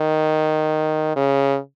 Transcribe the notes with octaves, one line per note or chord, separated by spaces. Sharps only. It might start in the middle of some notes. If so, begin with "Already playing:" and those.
Already playing: D#3
C#3